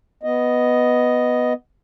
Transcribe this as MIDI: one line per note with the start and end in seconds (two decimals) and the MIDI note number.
0.23 1.53 59
0.23 1.53 75